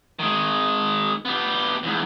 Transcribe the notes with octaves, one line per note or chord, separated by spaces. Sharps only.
D#3 G#3
B3 G4
E2 G#2